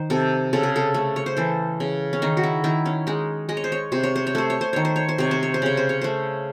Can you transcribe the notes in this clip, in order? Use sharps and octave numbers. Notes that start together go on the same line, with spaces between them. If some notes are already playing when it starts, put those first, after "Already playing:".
Already playing: D#3 C5
C3 A4
C#3 A4
G#4
A4
A3
C#5
C5
E3 A4
C#3
C#4
D#3 D#4
F#4
E4
D#3 E4
C#4
G#3 D#4
G#3 D#5
C#5
C5
C#5
C3 C5
C#5
C5
C#5
A3 C5
C#5
C5
D#3 C#5
C5
C#5
C5
C3 C#5
C5
C#5
C5
C#3 C#5
C5
C#5
A3 C5